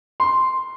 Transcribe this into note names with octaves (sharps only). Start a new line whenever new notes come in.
C6